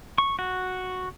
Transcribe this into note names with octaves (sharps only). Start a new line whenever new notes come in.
C#6
F#4